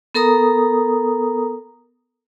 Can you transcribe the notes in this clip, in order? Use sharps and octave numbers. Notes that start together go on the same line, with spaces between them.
B3 A4 A#4 A#5 D#6